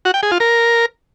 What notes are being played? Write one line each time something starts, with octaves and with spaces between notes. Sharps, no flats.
F#4
G5
G#4
F4
A#4